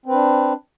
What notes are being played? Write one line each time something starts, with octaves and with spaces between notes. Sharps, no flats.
C4 D4 B4